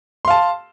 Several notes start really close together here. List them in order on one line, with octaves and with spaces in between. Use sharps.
C6 F5 A5